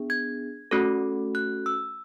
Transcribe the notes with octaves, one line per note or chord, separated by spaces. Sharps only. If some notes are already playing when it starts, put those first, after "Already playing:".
Already playing: B3 D4 G#4
G#6
A3 C#4 F#4 A4
F#6
E6